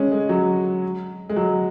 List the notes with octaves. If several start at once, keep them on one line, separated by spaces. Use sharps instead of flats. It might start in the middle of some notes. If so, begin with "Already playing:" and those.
Already playing: G#3 C#4
G#3
F#3
G#3
F#3